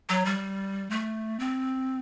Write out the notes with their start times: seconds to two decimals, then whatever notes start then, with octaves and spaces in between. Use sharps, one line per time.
0.09 F#3
0.25 G3
0.90 A3
1.39 C4